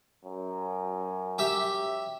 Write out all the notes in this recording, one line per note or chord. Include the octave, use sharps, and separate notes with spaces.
F#2
G4 E5